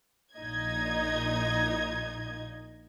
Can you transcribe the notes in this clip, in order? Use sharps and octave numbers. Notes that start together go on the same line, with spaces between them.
A#1 A#2 D#4 D#5 G#6